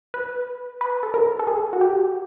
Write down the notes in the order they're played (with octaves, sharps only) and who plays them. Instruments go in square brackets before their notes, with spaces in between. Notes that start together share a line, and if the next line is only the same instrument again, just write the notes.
[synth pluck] B4
B4
A4
A#4
A4
G#4
F#4
G4